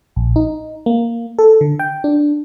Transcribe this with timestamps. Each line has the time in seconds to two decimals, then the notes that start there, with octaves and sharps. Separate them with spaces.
0.16 A#1
0.36 D#4
0.86 A#3
1.39 A4
1.61 D3
1.79 G5
2.04 D4